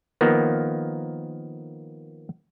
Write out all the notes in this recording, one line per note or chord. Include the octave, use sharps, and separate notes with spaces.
D#3 F3 A#3 B3